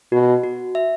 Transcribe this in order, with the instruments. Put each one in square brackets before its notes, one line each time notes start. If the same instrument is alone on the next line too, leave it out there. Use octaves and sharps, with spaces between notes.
[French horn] B2 [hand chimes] F#4
[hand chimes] F#4
E5